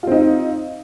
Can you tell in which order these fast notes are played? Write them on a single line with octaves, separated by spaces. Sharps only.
F4 C4 D#4